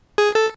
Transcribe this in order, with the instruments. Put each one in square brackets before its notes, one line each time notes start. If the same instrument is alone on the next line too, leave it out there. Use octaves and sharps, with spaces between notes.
[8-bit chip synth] G#4
A4